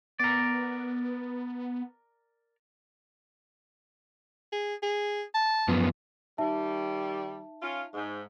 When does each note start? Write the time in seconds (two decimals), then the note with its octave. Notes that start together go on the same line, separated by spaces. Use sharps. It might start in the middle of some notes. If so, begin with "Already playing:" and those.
0.20 B3 A#4 D5
4.52 G#4
4.83 G#4
5.34 A5
5.68 F#2 F3 B3
6.38 D#3 G3 D#4 E5 A5
7.61 C#4 F4
7.94 G#2